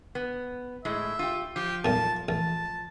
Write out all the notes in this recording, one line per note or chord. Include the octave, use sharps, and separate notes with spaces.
B3
A2 G#3 E5
F4 G4
F3 G4
B1 A#2 A5
A1 A5